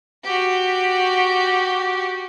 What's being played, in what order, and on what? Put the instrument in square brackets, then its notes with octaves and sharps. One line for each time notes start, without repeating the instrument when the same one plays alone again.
[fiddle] F#4 G4